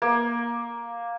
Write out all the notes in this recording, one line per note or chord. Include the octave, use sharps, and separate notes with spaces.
A#3